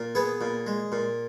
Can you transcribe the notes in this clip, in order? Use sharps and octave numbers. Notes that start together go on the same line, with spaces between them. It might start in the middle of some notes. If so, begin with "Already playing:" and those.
Already playing: A#2
B3 G#4
A#2
G#3
A#2